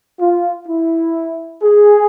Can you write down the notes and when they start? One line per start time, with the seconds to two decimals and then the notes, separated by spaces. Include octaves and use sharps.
0.19 F4
0.67 E4
1.61 G#4